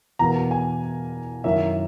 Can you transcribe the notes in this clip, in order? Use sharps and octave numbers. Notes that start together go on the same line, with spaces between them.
E2 B2 A#3 A#5
G#5
F#2 D#3 A#3 C#4 E4 E5